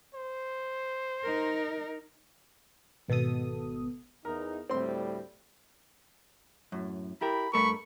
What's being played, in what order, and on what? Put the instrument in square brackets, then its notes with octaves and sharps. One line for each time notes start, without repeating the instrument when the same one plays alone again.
[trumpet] C5
[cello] D#4 A#4
[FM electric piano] G#1 B2 B3 A4 D#6
[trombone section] E2 D#4 [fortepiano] A#4
[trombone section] D2 A2 G3 [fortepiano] C4 C6
[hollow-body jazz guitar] F#2 A2
[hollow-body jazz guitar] E4 G4 A#4 [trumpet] B5
[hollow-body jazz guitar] G2 A3 A#4 [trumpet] B5 [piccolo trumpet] C#6